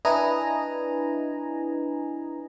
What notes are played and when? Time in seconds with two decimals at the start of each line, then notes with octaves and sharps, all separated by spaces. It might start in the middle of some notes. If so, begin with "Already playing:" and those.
0.05 D4 E4 B4 D#5 G#5 A#5